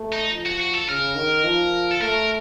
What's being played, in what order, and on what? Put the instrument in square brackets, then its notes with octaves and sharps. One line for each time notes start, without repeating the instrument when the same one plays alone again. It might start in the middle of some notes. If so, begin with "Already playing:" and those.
Already playing: [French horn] A3
[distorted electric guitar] D#4
[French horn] F3
[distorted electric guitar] F#4
F#4
A4
[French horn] C#3 [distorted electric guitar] A#4
[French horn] D#3
F3
[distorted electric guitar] A4
[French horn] A3 [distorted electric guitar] A#4